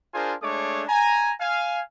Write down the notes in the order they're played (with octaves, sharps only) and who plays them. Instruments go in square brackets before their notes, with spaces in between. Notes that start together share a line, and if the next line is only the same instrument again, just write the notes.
[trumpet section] D4 F4 G#4 A#4 C5 G#5
G#3 A3 D4 G#4 C#5 D6
G#5 A#5
F5 G#5